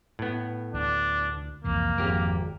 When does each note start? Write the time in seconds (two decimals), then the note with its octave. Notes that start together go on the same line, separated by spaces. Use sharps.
0.19 A2 B3
0.74 D2 D4
1.64 C2 F2 E3 A#3
1.98 G#1 F2 G4 A#4